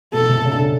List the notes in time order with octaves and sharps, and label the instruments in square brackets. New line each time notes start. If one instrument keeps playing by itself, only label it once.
[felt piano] B2 [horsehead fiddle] A4
[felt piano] C3
C#3
D3
C#3